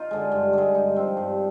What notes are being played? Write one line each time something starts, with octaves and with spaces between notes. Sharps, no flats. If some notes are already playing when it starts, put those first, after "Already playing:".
Already playing: D#4 F4
D3 G#3
G2
D3 G#3
G2 D#4
F3 C4
G2